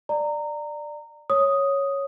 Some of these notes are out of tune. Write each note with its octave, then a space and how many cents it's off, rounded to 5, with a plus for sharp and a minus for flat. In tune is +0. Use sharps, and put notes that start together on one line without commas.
D5 +15 A#5 -20
C#5 +0 D#6 +0